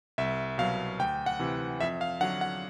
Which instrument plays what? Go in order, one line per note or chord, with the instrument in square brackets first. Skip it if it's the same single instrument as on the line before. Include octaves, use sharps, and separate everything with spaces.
[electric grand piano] C2 E5
B2 F#3 F5
D2 G5
F#5
C3 E3
F2 E5
F5
D3 F#3 F#5
F#5